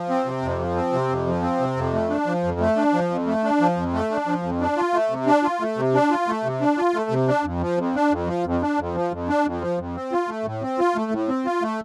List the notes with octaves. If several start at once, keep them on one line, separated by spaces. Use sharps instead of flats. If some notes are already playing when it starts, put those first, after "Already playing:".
Already playing: F3
C4
C3
F2
F3
C4
C3
F2
F3
C4
C3
F2
A3
D4
F3
F2
A3
D4
F3
F2
A3
D4
F3
F2
A3
D4
F3
F2
D4
F4
A3
C3
D4
F4
A3
C3
D4
F4
A3
C3
D4
F4
A3
C3
D4
F2
F3
F2
D4
F2
F3
F2
D4
F2
F3
F2
D4
F2
F3
F2
C4
F4
A3
A2
C4
F4
A3
A2
C4
F4
A3